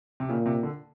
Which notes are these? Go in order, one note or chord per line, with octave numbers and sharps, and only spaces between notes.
C3
A#2 C#3
C3
D3